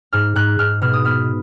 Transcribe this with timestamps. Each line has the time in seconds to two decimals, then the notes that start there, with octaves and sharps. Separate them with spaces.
0.13 G#2 F6
0.36 G#2 F#6
0.59 G#2 F6
0.82 B2 F6
0.93 D#6
1.05 B3 F6